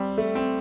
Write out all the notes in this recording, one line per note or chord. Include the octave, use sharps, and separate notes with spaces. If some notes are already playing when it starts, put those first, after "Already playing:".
Already playing: G3 C4
A3
C4